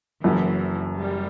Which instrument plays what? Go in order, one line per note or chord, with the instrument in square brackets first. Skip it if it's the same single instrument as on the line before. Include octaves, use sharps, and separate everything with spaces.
[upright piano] F#1 F#2 F#3 [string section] E3
[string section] G3